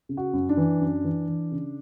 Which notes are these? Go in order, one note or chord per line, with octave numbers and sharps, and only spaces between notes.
C#3
F#4
F#2
D4
E3
F#2
E3
E3
C#3